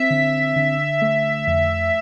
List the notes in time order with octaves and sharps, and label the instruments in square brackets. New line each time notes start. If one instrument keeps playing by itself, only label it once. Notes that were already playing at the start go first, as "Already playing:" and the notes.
Already playing: [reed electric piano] C4 [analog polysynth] E5
[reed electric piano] D3
D3
A3
F2